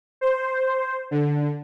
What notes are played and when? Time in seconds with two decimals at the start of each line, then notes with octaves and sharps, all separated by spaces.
0.21 C5
1.11 D3